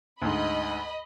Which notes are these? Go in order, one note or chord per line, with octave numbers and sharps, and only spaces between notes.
D2 G#2 D#5 B5